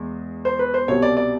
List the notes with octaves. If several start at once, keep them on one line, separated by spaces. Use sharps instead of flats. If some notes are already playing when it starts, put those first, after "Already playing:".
Already playing: E2 G#3
C5
B4
C5
C2 B2 G3 C#5
D5
D5